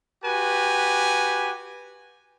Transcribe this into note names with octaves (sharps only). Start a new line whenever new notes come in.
F#4 G4 B4 G#5